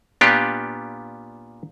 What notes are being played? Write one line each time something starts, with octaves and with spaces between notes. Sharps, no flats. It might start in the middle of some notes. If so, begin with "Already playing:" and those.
A#2 B3 D4 F4 G4